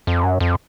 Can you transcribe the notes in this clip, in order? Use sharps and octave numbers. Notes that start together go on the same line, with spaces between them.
F2
F#2
F2